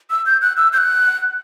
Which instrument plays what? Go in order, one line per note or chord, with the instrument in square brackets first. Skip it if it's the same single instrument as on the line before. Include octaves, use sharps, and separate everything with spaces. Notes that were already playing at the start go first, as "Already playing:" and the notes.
[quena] E6
G6
F#6
E6
G6
F#6